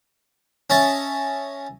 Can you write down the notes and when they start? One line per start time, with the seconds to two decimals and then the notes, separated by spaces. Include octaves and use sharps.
0.70 C#4 D#5 E5 A5